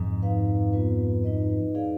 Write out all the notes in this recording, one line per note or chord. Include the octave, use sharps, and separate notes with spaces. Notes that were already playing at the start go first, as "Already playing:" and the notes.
Already playing: F2 G#2
D#4 B4 F5
B3 F4 B4
D#4 B4 D#5
D#4 G#4 D5 F5